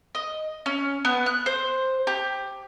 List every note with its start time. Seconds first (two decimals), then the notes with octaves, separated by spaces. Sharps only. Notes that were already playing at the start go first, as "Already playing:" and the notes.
0.15 D#5
0.66 C#4
1.05 B3
1.26 F#6
1.46 C5
2.07 G4